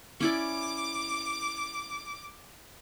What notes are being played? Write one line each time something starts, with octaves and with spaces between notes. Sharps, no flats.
C#4 E4 D5 D6